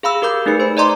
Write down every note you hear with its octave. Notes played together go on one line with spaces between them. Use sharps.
G#4 F5 B5 E6
G4 A#4 B5 D6 G6
A3 D#4 G#4 B4 C#7
C5 B5
D5 D#5 A#5 C6 D6